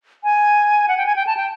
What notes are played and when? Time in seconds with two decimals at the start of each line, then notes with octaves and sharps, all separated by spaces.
0.24 G#5
0.88 F#5
0.97 G5
1.06 G#5
1.16 G5
1.27 A5
1.37 G5